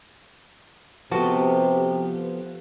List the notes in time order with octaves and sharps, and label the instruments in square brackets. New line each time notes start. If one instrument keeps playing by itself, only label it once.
[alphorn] C3 [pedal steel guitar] F3 B3 [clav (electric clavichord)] F#4 A5 [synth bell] G4 A4 B4